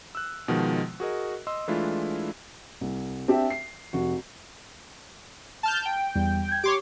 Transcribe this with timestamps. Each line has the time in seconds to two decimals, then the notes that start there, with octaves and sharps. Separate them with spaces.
0.15 E6 F#6
0.48 B2 D#3 F3 G#3
1.00 F#4 G#4 A#4 D#5
1.47 D#5 C6 E6
1.68 E3 G#3 A3 D4 E4 F4
2.81 C2
3.28 C4 D4 G4 E5 G5
3.50 C7
3.93 F1 F#4
5.63 A5 F6 G6
5.85 G5
6.15 E2 G3
6.49 G6 G#6
6.63 G4 C#5 C6 D6